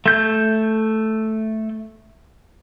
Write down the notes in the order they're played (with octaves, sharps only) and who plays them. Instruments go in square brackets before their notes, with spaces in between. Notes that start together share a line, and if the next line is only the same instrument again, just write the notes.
[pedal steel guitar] A3 G6